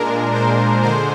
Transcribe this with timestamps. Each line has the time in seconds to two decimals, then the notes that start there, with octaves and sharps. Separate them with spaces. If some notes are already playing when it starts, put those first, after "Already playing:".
Already playing: A#2 G#3 D4 A#4
0.34 C5
0.83 D3 G#3 C5